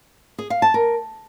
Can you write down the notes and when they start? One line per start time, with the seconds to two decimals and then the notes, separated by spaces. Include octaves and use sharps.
0.39 G#4
0.50 F5
0.62 A5
0.74 A#4